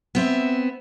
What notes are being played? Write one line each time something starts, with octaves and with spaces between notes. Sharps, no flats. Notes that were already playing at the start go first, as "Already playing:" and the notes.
B3 C4 E5